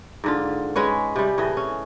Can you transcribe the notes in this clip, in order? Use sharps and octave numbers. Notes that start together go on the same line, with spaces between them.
G#2 D3 F4
G#3 C#4 B4 C#5
C3 G3
A2 E3 G#4 D#5
C#4